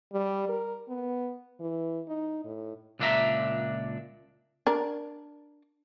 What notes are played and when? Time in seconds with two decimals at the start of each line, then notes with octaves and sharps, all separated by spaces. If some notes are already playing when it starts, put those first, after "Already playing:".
0.13 G3
0.49 A#4
0.89 B3
1.60 E3
2.08 D#4
2.45 A2
2.99 C#2 A#2 D4 F4 E5 A#5
4.67 D4 A#4